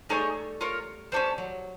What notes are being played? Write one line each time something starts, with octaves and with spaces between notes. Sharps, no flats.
G3 A3 D#4 G#4 C#5
F4 A#4 C#5
G3 C#4 F#4 A4 C5
F#3